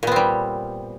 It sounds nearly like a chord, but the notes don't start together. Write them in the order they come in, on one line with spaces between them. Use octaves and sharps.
A#2 B3 C4 G3